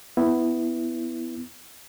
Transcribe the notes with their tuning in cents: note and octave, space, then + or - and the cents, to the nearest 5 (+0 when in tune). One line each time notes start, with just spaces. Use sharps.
B3 +10 E4 +0